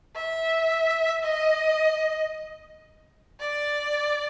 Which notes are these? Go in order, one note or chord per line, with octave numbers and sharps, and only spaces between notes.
E5
D#5
D5